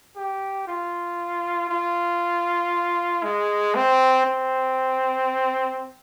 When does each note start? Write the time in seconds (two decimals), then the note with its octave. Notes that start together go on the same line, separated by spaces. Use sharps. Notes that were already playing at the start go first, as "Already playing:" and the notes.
0.16 G4
0.68 F4
1.70 F4
3.23 G#3
3.75 C4
4.26 C4